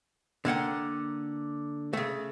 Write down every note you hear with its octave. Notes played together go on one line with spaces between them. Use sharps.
D3 A#3 F#5 G5
C#3 A3